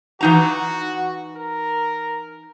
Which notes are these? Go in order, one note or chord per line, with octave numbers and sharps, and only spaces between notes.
E3 D#4 F#4 A#5
A#4